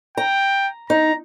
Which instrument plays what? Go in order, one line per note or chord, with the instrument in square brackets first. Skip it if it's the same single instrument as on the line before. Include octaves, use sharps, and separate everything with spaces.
[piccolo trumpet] G5 [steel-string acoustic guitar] A#5
[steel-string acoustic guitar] D#4 [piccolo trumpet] A#5